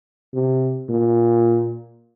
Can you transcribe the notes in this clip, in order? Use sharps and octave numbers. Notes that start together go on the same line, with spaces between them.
C3
A#2